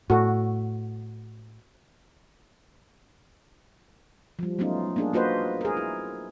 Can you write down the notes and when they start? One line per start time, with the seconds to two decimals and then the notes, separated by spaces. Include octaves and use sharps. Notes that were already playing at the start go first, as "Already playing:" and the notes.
0.10 A2 F#4 A4
4.39 F3 G3
4.59 F#3 A3 B3 C#4 D#4 F4
4.96 A#3 D4 G#4
5.13 A#3 F4 F#4 B4 C5 D#5
5.61 G#4 A#4
5.77 E4